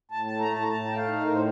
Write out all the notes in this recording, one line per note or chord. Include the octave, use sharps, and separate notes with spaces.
A2 A5
A3 A5
A#5
A2 A5
A#5
A2 A5
A3 G5
F5
D#4
A2 A#4
C5